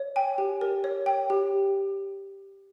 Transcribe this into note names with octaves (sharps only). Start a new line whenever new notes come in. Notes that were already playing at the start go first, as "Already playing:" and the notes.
Already playing: C#5
G5 G#5
G4
A#4
C#5
G5
G4